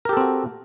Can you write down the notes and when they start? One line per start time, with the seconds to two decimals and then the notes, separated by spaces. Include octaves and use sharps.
0.05 A#4
0.09 G4
0.13 A4
0.17 C4
0.21 F#4